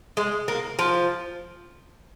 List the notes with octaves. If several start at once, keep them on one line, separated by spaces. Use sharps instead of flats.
G#3
A#3
F3